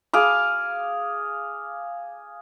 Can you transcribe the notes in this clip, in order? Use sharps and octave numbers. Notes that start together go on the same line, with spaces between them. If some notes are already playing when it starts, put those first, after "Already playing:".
G#4 F5 D6